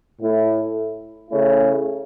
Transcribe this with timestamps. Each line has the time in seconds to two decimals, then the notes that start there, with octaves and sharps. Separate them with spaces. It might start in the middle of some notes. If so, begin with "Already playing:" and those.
0.21 A2 A3 E4
1.30 C#3 A3 C#4 E4